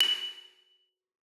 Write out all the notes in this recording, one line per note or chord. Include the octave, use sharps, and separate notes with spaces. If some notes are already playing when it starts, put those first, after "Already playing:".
F#7